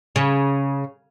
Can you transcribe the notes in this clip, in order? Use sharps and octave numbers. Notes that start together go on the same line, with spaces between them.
C#3